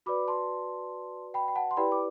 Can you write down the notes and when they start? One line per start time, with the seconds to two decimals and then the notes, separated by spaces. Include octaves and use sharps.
0.06 F#4 B4 D5 B5 D6
0.28 A5 C6
1.34 G5 B5
1.48 G5
1.56 F#5 A5
1.71 C6
1.77 E4 G4 B4 D5 G5 B5
1.92 D6